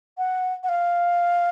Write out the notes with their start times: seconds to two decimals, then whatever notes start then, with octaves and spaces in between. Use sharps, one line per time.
0.18 F#5
0.63 F#5
0.69 F5